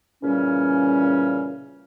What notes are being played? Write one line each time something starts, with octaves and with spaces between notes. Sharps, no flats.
A#2 C#3 E3 G3 C#4